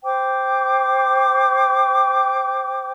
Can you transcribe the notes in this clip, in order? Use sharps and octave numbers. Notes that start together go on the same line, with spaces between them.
C5 G5 D6